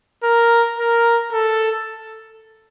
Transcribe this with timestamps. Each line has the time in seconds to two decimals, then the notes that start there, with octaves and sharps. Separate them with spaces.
0.23 A#4
0.79 A#4
1.33 A4